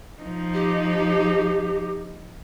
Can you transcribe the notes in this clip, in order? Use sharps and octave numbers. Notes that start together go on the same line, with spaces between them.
F3 D#4
G4